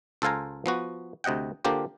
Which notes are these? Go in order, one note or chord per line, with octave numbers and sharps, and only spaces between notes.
C#2 A4 C5 F5 G#5 A#5
F3 B3 F#4
D2 C3 D#5 F#5 G5
D3 A#3 D4 F4 G4 C5